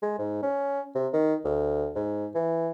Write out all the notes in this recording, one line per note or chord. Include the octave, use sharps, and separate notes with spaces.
G#3
G#2
C#4
C3
D#3
D2
G#2
E3